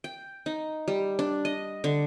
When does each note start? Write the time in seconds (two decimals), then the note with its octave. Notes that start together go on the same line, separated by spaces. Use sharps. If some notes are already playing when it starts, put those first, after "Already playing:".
0.04 G5
0.46 D#4
0.88 G3
1.19 D4
1.45 D#5
1.84 D3